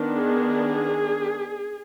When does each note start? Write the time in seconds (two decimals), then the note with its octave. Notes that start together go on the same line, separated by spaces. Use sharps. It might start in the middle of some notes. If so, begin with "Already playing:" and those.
Already playing: D#3 B3 D4
0.15 G#4